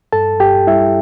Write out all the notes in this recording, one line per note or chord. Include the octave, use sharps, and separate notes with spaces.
G2 A4 A5
G2 G4 G5
G3 E4 E5